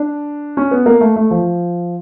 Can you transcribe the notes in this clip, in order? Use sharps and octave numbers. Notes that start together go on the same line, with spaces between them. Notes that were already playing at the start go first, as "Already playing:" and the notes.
Already playing: D4
C#4
B3
A#3
A3
A3
F3